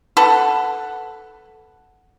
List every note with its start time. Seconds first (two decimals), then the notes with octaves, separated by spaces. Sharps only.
0.17 A4 B4 F#5